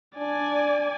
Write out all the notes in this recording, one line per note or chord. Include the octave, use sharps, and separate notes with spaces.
D4 D5 G#5